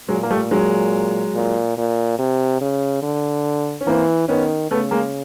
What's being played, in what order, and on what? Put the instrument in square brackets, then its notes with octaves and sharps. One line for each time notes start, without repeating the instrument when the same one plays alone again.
[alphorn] A#2 [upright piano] F#3 G#3
[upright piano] A#3
G3 A3
F#3 G#3
[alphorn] A#2
A#2
C3
C#3
D3
[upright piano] C#4
[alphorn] E3 [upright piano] A#3 C4
[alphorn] D#3 [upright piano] B3 C#4
[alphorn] C#3 [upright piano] A3 B3
[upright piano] G#3 A#3